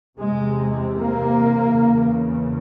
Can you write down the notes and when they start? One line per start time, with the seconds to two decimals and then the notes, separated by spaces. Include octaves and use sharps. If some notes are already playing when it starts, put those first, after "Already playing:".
0.18 E2 C3 G#3
0.95 A#3
1.74 E2 C#3